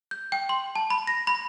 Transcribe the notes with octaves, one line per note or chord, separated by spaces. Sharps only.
G6
G5
C6
A5
B5
A#6
B5